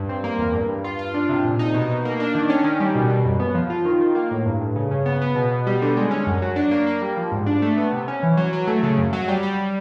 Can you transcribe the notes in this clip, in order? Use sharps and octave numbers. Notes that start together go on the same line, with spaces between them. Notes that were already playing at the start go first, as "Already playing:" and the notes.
Already playing: G2
C4
A#3
E2
G2
G2
F4
F4
D4
C3
A#2
D#4
B2
B2
A#3
D4
D#3
C#4
D#3
G3
B2
B2
F#2
B3
F3
F4
D#3
D#3
A#3
A2
G2
G2
C#3
C#3
B3
B3
B2
B2
G3
D3
G#3
C#4
F#2
F#3
D4
A#3
A#3
G3
F3
G#2
D4
A3
B3
C3
C#4
E3
F#3
F#3
A3
C#3
F#2
F#3
G3
G3